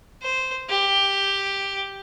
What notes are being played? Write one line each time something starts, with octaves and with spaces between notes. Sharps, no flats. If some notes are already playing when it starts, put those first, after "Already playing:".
C5
G4